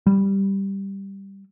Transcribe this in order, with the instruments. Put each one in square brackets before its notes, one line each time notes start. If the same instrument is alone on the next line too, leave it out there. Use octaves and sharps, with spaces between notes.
[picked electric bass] G3